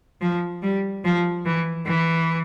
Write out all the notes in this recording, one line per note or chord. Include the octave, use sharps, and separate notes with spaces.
F3
G3
F3
E3
E3